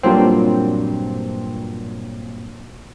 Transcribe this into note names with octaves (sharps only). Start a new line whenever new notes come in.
G2 A#2 F#3 C4